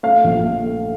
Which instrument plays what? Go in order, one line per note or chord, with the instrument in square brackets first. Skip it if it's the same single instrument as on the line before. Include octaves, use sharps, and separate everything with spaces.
[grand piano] A3 [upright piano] F5
[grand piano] A#1
A3
A3